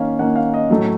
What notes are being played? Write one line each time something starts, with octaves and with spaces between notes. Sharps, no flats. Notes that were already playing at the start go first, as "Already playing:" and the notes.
Already playing: D#3 A#3 C#4 F5
D#3 A#3 C#4 F#5
F5
D#5
A2 F#3 A3